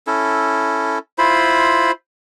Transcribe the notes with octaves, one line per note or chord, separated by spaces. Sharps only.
C#4 E4 A4
E4 F4 C5 B5